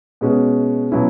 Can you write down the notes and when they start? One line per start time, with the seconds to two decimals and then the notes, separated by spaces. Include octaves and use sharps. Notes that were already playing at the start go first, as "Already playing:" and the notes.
0.21 B2 G#3 C#4 F#4
0.92 B2 F#3 C#4 E4